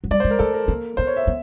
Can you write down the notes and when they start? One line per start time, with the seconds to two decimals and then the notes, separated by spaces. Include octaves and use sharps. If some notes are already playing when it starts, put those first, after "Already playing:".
0.04 F#3
0.11 G3 D5
0.20 C5
0.24 G#3
0.31 A#4
0.39 A3 A4
0.54 A#4
0.68 A#3
0.97 B3 C5
1.07 C#5
1.17 E5
1.27 B3